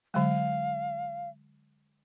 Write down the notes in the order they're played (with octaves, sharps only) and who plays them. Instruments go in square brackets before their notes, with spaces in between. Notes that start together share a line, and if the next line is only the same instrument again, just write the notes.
[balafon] D3 F#3 G#3 [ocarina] F5